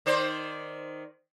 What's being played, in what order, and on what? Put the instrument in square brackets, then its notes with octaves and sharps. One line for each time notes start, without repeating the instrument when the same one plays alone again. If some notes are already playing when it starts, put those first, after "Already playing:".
[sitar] D#3 C5 D5